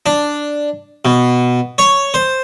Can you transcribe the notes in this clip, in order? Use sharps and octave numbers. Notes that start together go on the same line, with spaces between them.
D4
B2
C#5
C5